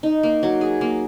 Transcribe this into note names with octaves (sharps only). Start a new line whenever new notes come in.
D#4
A#3
F#3
G#4
A#3